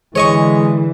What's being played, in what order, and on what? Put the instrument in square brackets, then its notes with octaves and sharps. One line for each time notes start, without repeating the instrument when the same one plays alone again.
[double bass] D3 E3 [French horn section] G#3 [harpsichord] C#5 D#5 C#6